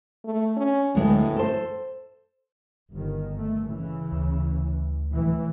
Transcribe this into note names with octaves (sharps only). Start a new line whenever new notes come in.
A3
C#4
D2 A2 G#3 B3
A4 C5
G1 D#3
A3
C#3 E3
D2
A2 E3